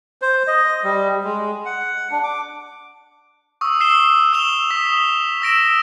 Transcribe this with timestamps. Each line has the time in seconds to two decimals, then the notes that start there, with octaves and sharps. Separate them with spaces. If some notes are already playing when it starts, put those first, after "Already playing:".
0.22 C5
0.47 D#5
0.84 G3
1.24 G#3
1.65 F#5
2.11 D4
2.23 D6
3.61 C#6 D#6 E6
3.80 D#6 E6 C7 E7 G7
4.33 E6 E7 F7 G7
4.70 D#6 B6
5.42 E6 A#6 D7 E7